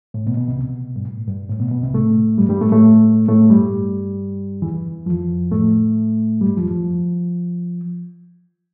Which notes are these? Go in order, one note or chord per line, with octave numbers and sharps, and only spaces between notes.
A2
B2
B2
C2 C3
B2
G2
A2
G2
A2
B2
B2
C2 C3
A2 A3
G2 G3
G2 G3
A2 A3
A2 A3
A2 A3
G2 G3
E2 E3
F2 F3
A2 A3
G2 G3
F2 F3
F3